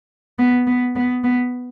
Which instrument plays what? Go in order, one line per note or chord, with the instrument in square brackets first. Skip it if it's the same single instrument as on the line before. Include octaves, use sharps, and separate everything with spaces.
[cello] B3
B3
B3
B3